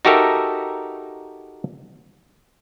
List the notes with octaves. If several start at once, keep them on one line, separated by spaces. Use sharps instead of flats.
D#4 F#4 G4 A4 A#4 E5